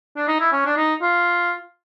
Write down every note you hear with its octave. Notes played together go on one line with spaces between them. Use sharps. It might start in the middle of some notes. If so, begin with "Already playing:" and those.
D4
D#4
E4
C#4
D4
D#4
F4